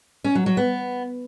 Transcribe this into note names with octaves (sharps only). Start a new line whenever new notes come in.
C#4
F#3
F#3
B3